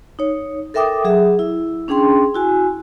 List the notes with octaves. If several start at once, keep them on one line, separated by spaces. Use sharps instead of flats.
D#4 C#5
A4 A#4 E5 G5 D6 D#6
F#3 G#4 E5
E4
C#4 D4 G#4 G5 C6
E4 F#4 G#5